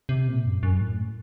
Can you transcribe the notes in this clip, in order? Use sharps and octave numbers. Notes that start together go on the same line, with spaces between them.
C3
A#2
F#2
F#2
A2